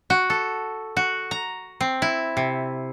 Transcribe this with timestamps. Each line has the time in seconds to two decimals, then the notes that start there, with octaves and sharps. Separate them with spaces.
0.10 F#4
0.30 A4
0.97 F#4
1.31 A#5
1.81 C4
2.02 E4
2.37 C3